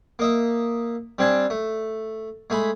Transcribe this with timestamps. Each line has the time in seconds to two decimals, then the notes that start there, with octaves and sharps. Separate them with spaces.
0.19 A#3 D#5 E5
1.18 G3 C4 D4 G#5 A5
1.50 A3
2.50 G#3 A3 G#5 B5